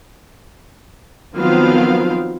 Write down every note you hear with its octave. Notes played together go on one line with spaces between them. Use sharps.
D#3 F3 F#3 B3 C4 F5